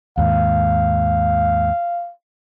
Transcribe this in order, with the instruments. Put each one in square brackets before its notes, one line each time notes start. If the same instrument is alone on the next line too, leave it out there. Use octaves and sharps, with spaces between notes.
[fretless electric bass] D#2 G#2 [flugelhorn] F5